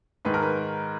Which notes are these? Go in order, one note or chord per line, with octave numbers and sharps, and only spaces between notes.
G#2 D#3 B4
A#4
B4